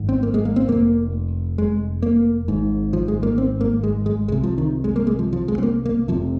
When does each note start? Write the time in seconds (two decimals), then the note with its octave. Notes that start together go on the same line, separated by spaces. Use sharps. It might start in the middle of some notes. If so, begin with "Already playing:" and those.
Already playing: G#1 G#2
0.09 C4
0.23 A#3
0.34 G#3
0.45 A#3
0.56 C4
0.68 F1 D#2 A#3
1.58 G#3
2.03 A#3
2.48 G#1 G#2
2.93 F3
3.08 G#3
3.23 A#3
3.38 C4
3.61 A#3
3.83 G#3
4.06 G#3
4.28 C2 C3 G#3
4.43 F3
4.58 D#3
4.84 G#3
4.96 A#3
5.07 G#3
5.19 F3
5.33 F3
5.48 G#3
5.58 C4
5.63 A#3
5.85 A#3
6.08 F1 F2 C3 F3